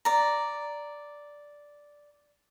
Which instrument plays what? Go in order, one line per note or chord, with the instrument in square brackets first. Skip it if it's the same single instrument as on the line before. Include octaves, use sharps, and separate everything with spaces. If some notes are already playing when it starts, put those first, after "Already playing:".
[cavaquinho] D5 A#5